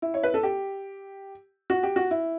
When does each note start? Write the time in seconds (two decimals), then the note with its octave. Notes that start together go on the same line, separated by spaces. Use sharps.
0.02 E4
0.14 C#5
0.23 B4
0.34 A4
0.43 G4
1.70 F#4
1.83 G4
1.96 F#4
2.11 E4